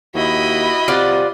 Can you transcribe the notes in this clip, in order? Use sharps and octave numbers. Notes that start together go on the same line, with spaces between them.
D#2 E4 F#4 D#5 B5
C3 F4 D5 F#5